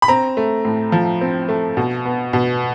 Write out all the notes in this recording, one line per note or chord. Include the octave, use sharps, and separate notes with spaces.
B5
C4 A#5
A3
A2
F3
C4
A3
B2
B3
B2